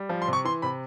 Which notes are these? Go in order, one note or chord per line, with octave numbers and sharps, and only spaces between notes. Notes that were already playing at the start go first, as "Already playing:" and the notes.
Already playing: G3
F3
C6
C3
C#6
E3 C6
C3 B5